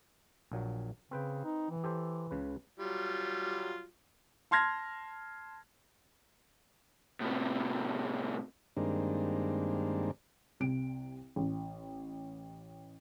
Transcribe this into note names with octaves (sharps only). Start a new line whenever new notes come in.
A#1 A#2 F#3
C#3 C4 B4 G5
D#4
E3
G4 A4 C5
C#2 C#3 B4
F#3 G3 F4
A5 C6 F6 G#6 A#6
A2 C3
G2 D#3 G#3 A#3 C4 D4
C2 C3 D7
A1